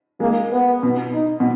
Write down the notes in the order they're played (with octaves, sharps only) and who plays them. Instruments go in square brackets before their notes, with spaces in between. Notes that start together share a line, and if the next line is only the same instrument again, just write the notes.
[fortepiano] G#3 [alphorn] A#3
[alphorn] B3
[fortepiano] B2
[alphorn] D#4
[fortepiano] B2